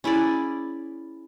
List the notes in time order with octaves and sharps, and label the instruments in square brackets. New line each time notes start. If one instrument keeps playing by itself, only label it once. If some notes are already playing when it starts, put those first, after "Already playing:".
[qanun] C#4 E4 G#4 D5